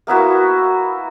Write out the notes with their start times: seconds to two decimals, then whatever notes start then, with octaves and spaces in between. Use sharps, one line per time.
0.07 A#3 B3 E4 F#4